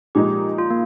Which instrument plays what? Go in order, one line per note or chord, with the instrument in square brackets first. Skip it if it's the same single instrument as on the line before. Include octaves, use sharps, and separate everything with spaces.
[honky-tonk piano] A#2 F3 G#3 D#4 [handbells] G4
[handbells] F4
A#3